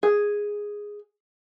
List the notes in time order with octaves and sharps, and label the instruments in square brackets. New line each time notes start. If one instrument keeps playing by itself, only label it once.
[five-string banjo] G#4